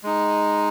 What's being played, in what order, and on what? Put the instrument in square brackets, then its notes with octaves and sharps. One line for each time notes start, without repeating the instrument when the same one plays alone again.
[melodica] G#3 D#4